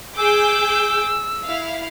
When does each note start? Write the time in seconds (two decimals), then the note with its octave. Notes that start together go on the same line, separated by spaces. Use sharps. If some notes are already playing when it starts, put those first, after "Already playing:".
0.17 G#4 D6 E6 G6
1.43 E4 F5